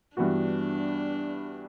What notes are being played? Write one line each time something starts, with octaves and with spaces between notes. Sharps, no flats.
G2 E3 B3 D4 F#4